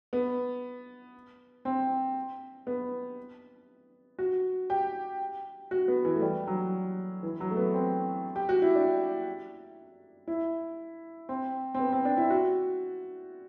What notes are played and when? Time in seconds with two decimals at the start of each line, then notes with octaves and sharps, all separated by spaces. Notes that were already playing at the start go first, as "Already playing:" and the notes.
0.13 B3
1.65 C4
2.67 B3
4.19 F#4
4.70 G4
5.71 F#4
5.88 B3
6.05 E3
6.15 A3
6.22 G3
6.47 F#3
7.23 E3
7.40 F#3
7.50 A3
7.57 B3
7.74 C4
8.36 G4
8.49 F#4
8.62 E4
8.75 D4
10.28 E4
11.29 C4
11.74 C4
11.79 B3
11.92 C4
12.05 D4
12.17 E4
12.30 F#4